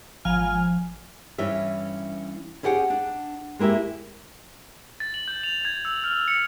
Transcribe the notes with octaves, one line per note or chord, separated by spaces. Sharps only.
G#1 F3 G#5 F6
G2 E3 C#4 E5
C#4 E4 G4 G#4 F#5 G5
D4
G#3 A#3 E4 G4 E5
A6
F#7
G6
F7
G#6
E6
F6
C#7